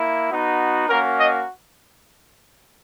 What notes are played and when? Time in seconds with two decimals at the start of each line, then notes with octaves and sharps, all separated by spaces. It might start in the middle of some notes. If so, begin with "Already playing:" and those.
Already playing: A#3 E4
0.29 B3 D#4 F#4
0.88 A#3 C#4 F#4 A#4
1.18 D#5